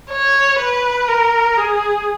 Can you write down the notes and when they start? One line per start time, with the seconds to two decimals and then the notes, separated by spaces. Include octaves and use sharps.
0.11 C#5
0.59 B4
1.08 A#4
1.57 G#4